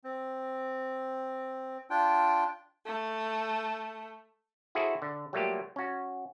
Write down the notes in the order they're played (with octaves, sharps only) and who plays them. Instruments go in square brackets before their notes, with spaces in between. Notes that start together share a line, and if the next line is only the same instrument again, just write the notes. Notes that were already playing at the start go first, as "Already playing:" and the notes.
[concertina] C4
D4 F4 G5
[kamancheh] A3
[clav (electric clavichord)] E4 F#4 G#4 A4 C5 E5
D3
F#3 G3 A3 A#3 F4 G4
C#4 F#4